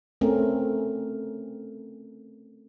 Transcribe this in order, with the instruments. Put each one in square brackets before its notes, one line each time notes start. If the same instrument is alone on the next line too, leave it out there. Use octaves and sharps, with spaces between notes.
[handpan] A3 C4 C#4 A#4